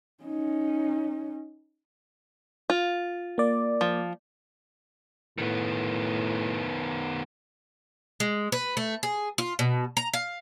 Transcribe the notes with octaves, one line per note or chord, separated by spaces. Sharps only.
C#4 D#4
F4
A#3 D5
F3
A2 D#3 B3
G#3
B4
A3
G#4
F4
B2
A#5
F5